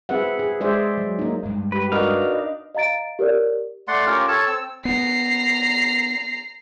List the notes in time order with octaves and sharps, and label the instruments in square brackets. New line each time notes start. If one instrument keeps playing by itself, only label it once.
[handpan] C4 G#4 B4 E5 F#5
G#4
G#3 G#4 C5 D5 E5
F#3
A#3 D#4
[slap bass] G2 G#3
[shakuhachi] G4 [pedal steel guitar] B4
[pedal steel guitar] D4 D#4 F5 [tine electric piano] F#4 A#4 B4 [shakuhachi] D#5
[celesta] D#5 F5 A#5 A6 D7
G4 A#4 C#5 D5
[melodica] A3 D5 F#5 C6
C#4 F4 G4 A#4
A4 C#5 A5
C4 E6
[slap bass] B3 [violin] A#5 C7